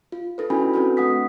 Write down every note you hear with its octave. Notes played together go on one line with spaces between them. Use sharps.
F4
D#4 A4 B4
C#4 D4 E4 F#4 G#5 B5
C4 D4 F#4 A4 B4
A3 F#5 D#6 B6